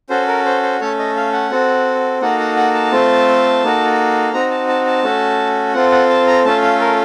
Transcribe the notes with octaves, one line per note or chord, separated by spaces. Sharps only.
C#4 F#4 A4 C5
A#4
C5
C5
A3 C#4 A4 C#5
D#5
F5
F#5
C4 F#4 A4
A#3 D#4 F#4 A4 F#5
F#5
F#5
A5
A3 C4 F4 A4
A#3 D#4 F#4 A4
C4 D#4 F#4 A#5
A5
A5
A5
A3 C#4 F#4 A4
C4 F4 A4 F#5
F#5
A5
A#5
A3 C#4 F4 A4 A5
F5
A#4